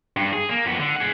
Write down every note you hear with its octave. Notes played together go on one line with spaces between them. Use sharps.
G2
G#4
A#3
F2 B3
D3
G#4 F#5